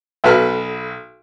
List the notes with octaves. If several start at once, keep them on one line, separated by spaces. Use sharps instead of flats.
B1 F#4 A4 B4 F6